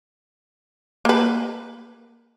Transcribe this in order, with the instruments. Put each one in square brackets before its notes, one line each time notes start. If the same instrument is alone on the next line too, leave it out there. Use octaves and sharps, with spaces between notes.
[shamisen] A#3 B4